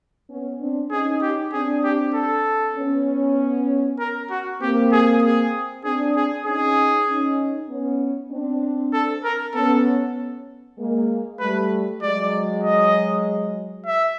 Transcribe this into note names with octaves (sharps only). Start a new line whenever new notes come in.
B3 C#4
C4 D4
C#4 D#4 G#4
G4
C4 D4 G#4
G4
A4
B3 C#4
A#4
F#4
A#3 C4 G4
G#4
G#4
C4 D4 G#4
G#4
C#4 D#4 G#4
C#4 D#4
B3 C#4
C4 D4
A4
A#4
B3 C#4 A4
G#3 A#3
G3 A3 B4
F#3 G#3 D5
D#5
E5